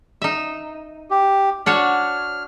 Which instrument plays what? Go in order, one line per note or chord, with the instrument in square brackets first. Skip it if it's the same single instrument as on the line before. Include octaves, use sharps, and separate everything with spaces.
[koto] D#4 E5
[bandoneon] G4
[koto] D4 F#4 C#5 [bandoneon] F6